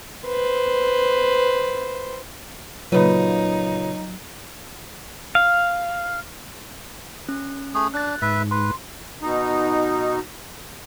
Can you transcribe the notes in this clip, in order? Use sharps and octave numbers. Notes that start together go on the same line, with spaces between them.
B4 C5
A#2 C#3 F#3 D#4 F4 B4 C#5
F5
C#4
A3 G#4
D4 F#6 A6
G#2 B4 E5
B4 C6
B2 D#4